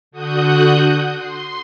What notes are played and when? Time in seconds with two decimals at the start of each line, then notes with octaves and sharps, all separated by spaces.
0.11 D3 F#4 D#6 F#6 G6
1.16 C6